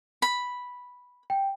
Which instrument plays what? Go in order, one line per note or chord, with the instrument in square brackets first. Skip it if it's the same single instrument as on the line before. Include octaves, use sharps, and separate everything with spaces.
[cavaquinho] B5
[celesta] G5